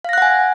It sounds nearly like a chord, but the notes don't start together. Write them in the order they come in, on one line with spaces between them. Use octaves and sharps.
F5 A#6 F#6 F#5 G#5